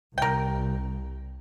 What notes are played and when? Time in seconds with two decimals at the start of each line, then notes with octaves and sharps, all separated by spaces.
0.18 C2 A#4 G5